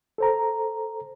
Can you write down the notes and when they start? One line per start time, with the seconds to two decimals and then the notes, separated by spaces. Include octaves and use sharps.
0.18 A4 C5 A#5